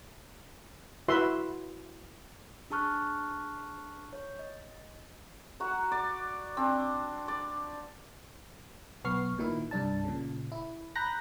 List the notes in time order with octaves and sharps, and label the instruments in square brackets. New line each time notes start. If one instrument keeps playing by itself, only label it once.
[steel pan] E4 F#4 B4 E5 C6
[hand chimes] D4 G#4 A5 C#6 F6 F#6
C#5
D#5
[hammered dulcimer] F#4 F#5 A#5
D5
C4 D4
D5
[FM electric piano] B1 B3 C#6 F6 C7
A#2 D#3 E4
C2 G2 D4 A5
A#2 C#3
E4
A#5 B5 F#6 G6 A#6